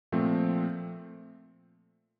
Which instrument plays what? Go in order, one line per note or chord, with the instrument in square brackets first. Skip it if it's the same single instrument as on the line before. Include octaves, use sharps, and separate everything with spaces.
[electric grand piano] A#2 F3 A3 C4